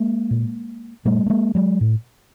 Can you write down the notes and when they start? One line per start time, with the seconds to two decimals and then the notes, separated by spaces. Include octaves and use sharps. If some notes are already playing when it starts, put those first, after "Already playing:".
Already playing: G#3 A#3
0.31 A#2
1.05 A#2 G3 A3
1.26 A3
1.30 G#3 A#3
1.55 F#3 G#3
1.81 A2